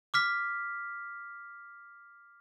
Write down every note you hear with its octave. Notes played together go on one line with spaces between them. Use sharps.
D6 F6 B6